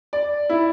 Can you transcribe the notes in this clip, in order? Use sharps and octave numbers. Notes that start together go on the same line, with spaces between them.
D5
E4